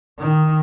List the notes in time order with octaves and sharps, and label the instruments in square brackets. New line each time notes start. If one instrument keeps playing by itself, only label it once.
[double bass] D#3